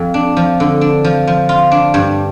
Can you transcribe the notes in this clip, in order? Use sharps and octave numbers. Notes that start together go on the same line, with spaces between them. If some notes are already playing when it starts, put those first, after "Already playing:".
Already playing: F2
D4
F3
D3
D4
F3
F3
F4
D4
G2